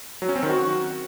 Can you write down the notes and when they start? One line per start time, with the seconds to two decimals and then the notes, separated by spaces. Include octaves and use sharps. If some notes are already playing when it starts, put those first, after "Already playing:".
0.22 F#3
0.29 C#4
0.36 C4
0.43 D#3
0.49 F#4